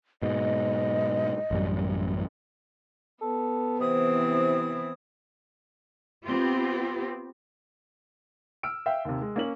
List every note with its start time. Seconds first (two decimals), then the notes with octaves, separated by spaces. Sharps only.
0.22 G#2 B2 D#5
1.51 A1 F#2 G3
3.21 B3 A4
3.80 C3 E3 C4 E4 D#6
6.26 B3 C4 F4 G4
8.63 E6 F6 D7
8.86 E5 F5 G5
9.05 D#2 C3
9.21 G#3
9.36 A#3 C#4 F#7